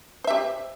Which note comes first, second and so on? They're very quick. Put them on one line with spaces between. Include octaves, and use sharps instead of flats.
C5 E5 G4